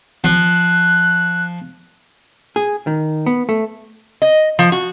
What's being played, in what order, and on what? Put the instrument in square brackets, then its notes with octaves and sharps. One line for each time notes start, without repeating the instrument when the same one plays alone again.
[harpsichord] F3 [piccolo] F#6
[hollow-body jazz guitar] G#4
D#3
B3
A3
[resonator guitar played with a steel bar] D#5
F3
F#4